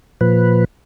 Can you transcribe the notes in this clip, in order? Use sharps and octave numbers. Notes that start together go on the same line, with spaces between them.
A#2 F3 B4